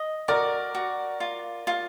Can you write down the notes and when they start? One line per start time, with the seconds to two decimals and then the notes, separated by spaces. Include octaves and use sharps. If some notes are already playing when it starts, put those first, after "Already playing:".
Already playing: D#5
0.28 F#4 A#4 D5
0.75 F#4
1.20 F4
1.67 F4